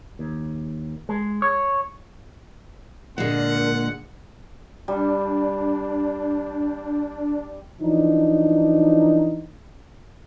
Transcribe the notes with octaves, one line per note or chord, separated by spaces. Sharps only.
D#2
G#3
C#5
A#2 D3 G#3 A#4 F#5
G3 D4
E3 F3 D4 D#4